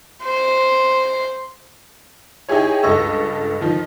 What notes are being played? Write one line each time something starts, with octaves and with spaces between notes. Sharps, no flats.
C5
D#4 E4 G4 G#4 C#5
C#2 G2 A4 D#5 C#6 E6
D#3 F3 D#4